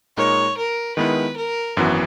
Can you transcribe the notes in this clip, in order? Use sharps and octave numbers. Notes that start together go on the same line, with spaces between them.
A#2 G#3 D#4 A#4 C#5
A#4
D#3 G#3 B3 E4 B4
A#4
G#1 F#2 E3 B3 F#4